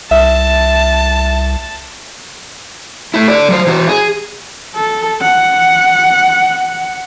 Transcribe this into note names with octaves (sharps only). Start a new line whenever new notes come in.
C2 E5 A5
A3 E4
D3 D5
F#3 C5
E3 F#4
G#4
A4
F#5